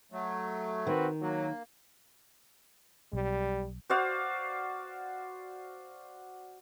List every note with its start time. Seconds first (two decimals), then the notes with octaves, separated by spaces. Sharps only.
0.12 F#3 A3
0.87 D#3 C4 F#4 B4
1.22 F#3 A#3
3.13 B1 G3
3.90 F#4 C5 D5 F5